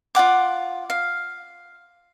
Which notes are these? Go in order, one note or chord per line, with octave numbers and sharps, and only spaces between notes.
F4 D5 F#5 D6
F5